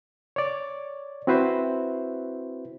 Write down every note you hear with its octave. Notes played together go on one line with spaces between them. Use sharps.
C#5 D5
C4 E4 F#4 B4 C5 E5